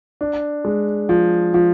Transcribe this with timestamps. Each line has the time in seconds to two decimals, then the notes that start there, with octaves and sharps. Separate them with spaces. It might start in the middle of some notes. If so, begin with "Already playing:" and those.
0.21 D4
0.65 G#3
1.09 F3
1.54 F3